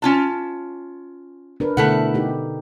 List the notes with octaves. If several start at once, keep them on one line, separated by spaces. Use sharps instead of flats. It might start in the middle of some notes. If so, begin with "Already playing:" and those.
C#4 F4 A5
D4 A#4 B4
B2 D3 A3 E4 A4 F#5
D#4 G4